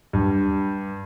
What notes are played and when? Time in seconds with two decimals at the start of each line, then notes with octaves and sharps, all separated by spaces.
0.13 G2